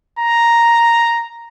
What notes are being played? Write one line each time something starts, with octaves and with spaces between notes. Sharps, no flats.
A#5